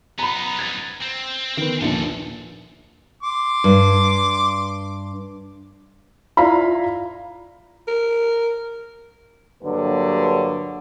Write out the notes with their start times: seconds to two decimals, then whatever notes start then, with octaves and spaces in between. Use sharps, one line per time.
0.19 B3 D#4 A#5 B5
0.59 G#6 A6
1.02 C4
1.57 D#3 B3 C5 G5
1.81 A#1 D#2 G#3 D4 A4
3.23 C6 D6
3.64 G2
6.37 E4 F4 D5 F5 A#5 B5
7.88 A#4
9.63 G2 D3 F#3 A#3 G4 B4